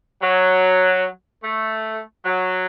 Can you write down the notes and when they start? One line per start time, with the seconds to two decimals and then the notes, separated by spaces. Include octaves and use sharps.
0.22 F#3
1.44 A3
2.25 F#3